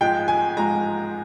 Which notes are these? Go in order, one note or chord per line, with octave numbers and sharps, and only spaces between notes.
G#2 F3 G#3 G5
G#5
G#2 F3 G#3 A#5